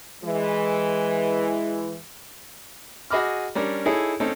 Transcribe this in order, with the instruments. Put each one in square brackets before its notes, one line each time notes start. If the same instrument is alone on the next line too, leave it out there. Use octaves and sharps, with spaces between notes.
[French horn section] E3 G#3
[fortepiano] F#4 G#4 D#5 B5 D6 F6
G3 C#4 D4 A#4
D#4 E4 G#4 A4 C#5
C4 C#4 D#4 A4